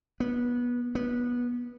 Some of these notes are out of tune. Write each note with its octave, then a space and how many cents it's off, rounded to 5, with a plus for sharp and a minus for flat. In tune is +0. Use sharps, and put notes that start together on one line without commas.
B3 -20
B3 -20